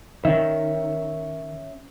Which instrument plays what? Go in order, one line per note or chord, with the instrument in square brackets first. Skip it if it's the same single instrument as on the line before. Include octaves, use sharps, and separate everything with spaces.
[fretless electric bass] D#3 [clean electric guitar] C#4 E5